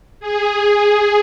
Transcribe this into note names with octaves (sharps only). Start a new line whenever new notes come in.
G#4
G#4